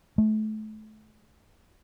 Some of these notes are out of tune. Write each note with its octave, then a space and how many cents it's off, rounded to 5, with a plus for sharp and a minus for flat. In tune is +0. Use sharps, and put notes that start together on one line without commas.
A3 -30